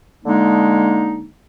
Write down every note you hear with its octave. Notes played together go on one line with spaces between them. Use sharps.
D3 G#3 A#3 D4 D#4